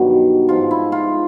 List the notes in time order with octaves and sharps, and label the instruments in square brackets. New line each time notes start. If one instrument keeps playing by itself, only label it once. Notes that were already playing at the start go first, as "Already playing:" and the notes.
Already playing: [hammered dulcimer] G2 B2 D#3 F#3
G#2 F3 F4
E4
F4